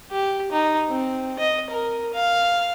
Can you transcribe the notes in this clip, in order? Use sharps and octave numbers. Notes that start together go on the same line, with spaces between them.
G4
D#4
C4
D#5
A#4
F5